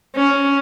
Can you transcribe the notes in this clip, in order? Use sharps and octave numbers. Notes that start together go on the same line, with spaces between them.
C#4